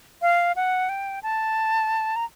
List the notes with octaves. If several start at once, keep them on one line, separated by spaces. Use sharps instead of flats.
F5
F#5
G5
A5
A#5